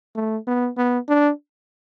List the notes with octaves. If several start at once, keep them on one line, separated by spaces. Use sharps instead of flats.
A3
B3
B3
D4